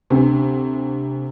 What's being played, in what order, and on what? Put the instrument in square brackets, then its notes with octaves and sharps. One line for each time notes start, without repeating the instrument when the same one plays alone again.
[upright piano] D2 C3